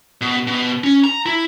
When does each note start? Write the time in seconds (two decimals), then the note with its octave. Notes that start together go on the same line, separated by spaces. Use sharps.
0.21 B2
0.47 B2
0.84 C#4
1.04 A#5
1.26 E4